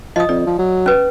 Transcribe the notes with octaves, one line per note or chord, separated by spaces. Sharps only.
F3 D#5 D#6
F2 D5
F3
F#3
C#4 B4